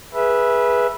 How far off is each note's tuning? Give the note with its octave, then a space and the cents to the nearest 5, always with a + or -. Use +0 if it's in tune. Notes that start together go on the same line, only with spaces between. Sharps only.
G#4 +0 B4 -15 E5 +5